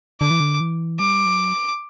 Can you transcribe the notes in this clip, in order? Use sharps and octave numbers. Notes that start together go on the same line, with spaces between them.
D3 D6
E3
D3
E3
G3 D6
F#3